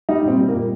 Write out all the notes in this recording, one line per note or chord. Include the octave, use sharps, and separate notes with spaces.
G3 D#4
A#2 C4
G3
A#3
A#2